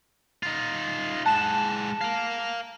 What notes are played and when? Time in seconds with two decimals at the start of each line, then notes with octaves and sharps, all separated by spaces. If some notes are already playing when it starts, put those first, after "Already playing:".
0.43 D#4 F4
1.26 G#3 F#5 A5 E7
2.01 A#4 F5